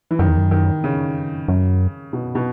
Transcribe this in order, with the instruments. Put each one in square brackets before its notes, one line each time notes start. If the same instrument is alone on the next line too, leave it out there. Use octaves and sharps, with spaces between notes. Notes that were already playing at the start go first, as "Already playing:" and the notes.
[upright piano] E3
[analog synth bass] F#2 [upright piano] D#3
[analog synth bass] E2
F#2
[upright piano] D#3
C#3
[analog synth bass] F#2
[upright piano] B2
B2